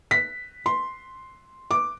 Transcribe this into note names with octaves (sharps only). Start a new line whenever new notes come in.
B6
C6
D6